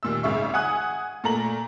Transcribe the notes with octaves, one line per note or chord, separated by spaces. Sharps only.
D#2 A#2 E6
G#1 G#2 C#3 E5 C#6
F#5 G#5 D#6 F#6
A#2 A3 A#5 F#7